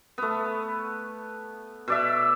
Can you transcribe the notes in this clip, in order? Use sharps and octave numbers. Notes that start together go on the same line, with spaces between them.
A3 B3
B2 D5 E5